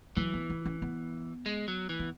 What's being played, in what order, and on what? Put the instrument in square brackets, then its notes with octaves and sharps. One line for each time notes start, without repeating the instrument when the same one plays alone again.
[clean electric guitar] E3 [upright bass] F#3
[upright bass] B3
E4
C#4
B3
[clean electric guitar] G#3
F#3
E3
[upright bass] B3